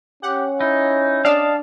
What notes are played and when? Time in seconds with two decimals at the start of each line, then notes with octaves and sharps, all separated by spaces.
0.23 C#4 G4 F#5
0.61 D#4 E4
1.25 D4 D5 D#5 F5 A5